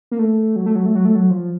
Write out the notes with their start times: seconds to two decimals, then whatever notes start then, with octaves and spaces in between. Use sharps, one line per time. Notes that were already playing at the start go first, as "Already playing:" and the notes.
0.11 A#3
0.19 A3
0.56 F#3
0.66 A3
0.75 F#3
0.86 A3
0.95 F#3
1.05 A3
1.15 F#3
1.30 F3